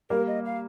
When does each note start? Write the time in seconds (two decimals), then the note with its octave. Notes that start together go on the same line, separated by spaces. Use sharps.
0.10 G3 A#3 A#4
0.27 D#5
0.45 F5